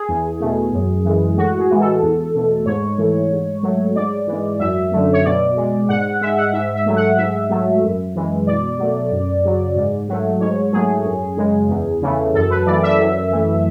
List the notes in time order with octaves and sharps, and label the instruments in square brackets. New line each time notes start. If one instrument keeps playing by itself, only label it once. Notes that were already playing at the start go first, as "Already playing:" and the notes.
Already playing: [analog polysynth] G#4
E2
B2 A3
F#2
E3 G#3
A2 F#4
G#4
E3 G#3
A4
E2
B2 A3
G#2 C#5
E3 A3
G#2
F#3 A3
G#2 D5
E3 G#3
F#2 E5
D3 F#3 A3
C#5
B2 D5
G#3
G#2 F#5
G#3 E5
F#5
G#2 E5
E5
F#3 A3
F#5
G#2 E5
F#3 A3
F#2
E3 G#3
B2 D5
F#3 A3
F#2
C#3 F#3
G#2
F#3 A3
G#2 C#5
F#3 A3 G#4
F#2
C#3 G#3
E2
C#3 E3 A3
F#2 A4
B4
E3 A3 D5
E5
F#2
E3 A3